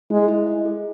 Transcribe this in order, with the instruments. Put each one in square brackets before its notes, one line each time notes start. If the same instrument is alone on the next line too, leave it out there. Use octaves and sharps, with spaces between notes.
[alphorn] G#3 [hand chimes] E4
[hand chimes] E4
D#5
G#4